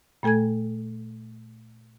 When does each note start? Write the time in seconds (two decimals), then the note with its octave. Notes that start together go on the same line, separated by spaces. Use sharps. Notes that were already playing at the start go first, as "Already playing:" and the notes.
0.23 A#2 A3 A4 G#5 G#6